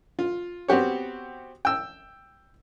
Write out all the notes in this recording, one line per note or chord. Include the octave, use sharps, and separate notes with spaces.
F4
B3 C4 F#4 G4 C#5
G5 E6